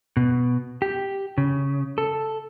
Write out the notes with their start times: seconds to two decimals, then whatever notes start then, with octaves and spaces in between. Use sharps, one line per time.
0.17 B2
0.82 G4
1.38 C#3
1.98 A4